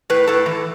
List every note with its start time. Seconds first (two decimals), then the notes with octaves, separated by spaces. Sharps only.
0.10 A2 B4
0.27 A2 A4
0.46 E3